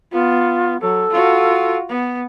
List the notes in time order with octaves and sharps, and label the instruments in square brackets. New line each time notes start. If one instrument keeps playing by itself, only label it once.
[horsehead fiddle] B3 [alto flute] F4
[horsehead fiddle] F#3 [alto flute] A4
[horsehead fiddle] F4 F#4
B3